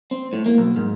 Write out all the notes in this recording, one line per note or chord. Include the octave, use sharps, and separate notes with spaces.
C4
A2
A#3
B1
G#2